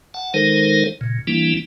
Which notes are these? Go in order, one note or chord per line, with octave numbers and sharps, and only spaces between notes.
F#5 A5
D#3 G#3 D#4 A4 A#4 C5
A#2 C#3
E3 G3 A#3 D4 E4